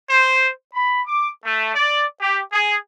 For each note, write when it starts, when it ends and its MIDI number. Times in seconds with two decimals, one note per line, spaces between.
0.10 0.50 72
0.74 1.02 83
1.06 1.30 86
1.45 1.74 57
1.75 2.03 74
2.21 2.41 67
2.53 2.77 68